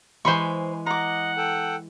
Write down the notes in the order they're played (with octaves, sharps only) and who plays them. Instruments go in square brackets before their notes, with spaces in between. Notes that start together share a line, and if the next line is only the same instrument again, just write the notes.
[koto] E3 G#3 [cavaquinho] C5 B5 C#6
[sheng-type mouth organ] D#5 [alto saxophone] F#5 [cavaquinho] A#5 D6
[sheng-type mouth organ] A4 G5